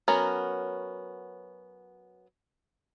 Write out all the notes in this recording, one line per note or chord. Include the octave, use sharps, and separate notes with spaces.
F#3 B3 C#4 A#4